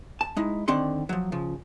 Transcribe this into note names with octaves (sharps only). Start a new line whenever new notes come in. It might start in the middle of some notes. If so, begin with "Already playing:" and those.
A5
G#3 D#4 E4
D3 D#3 C4 D4 F#5 C6
F3 F#3
C#3 F3